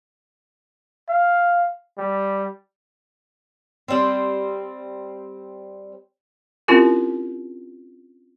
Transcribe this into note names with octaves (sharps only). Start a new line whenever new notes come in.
F5
G3
G3 C4
C4 C#4 E4 F4 G4 A#4